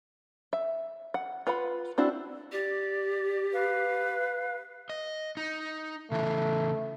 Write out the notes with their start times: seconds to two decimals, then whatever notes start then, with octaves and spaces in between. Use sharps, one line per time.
0.53 E5
1.14 F#5
1.47 F4 B4 F#5 B5
1.98 C4 D4 E4 F#4
2.52 G4 D5
3.53 B4 F5
4.90 D#5
5.37 D#4
6.12 C#3 E3 A3